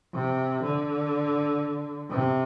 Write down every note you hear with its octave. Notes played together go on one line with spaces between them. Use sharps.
C3
D3
C3